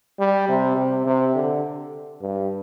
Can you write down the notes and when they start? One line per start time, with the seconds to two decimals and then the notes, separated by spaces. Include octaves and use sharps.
0.19 G3
0.49 C3
0.77 C3
1.06 C3
1.35 D3
2.21 G2